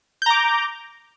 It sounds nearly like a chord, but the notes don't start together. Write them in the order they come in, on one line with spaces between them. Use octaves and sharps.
G6 A#5 D6